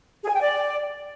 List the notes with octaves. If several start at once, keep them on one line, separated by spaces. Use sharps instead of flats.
G#4
G#5
G5
D5